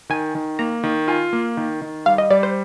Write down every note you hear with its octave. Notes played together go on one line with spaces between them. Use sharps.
D#3 G#5
D#3
A#3 A#5
D#3
F4 G#5
A#3
D#3
D#3
G3 F5
D#5
G3 D5
C5